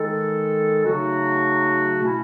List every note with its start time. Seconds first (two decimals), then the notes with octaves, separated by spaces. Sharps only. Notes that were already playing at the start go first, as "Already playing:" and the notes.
Already playing: D#3 G#3 D#4 A4
0.85 C#3 F#3 A3 D#4 F#4
2.00 B2 A3 C#4 E4